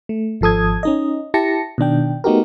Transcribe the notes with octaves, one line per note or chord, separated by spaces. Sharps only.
A3
G#1 F3 A4 D#6 G#6
C#4 D#4 D#5
E4 G4 A5 A#6 C#7
B2 D#3 D4 G5
A3 B3 D#4 F#4 G4 A#4